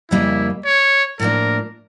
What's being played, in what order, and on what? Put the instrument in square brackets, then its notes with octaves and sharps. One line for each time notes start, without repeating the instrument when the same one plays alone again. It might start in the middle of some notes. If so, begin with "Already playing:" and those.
[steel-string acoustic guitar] F2 C#3 G3 A#3 C#4 [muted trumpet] E4
[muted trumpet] C#5
[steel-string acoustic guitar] A2 F3 A#3 D4 [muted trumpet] A#4